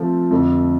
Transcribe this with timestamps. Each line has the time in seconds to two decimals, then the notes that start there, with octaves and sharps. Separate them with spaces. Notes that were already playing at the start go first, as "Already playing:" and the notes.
Already playing: F3 A3 C4 F4
0.31 F2 D3 A3